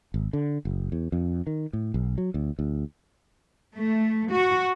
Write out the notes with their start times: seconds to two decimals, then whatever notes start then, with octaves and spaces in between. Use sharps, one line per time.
0.14 G#1
0.33 D3
0.65 F#1
0.92 E2
1.12 F2
1.47 D#3
1.73 A2
1.94 B1
2.18 F#3
2.34 D2
2.59 D2
3.75 A3
4.30 F#4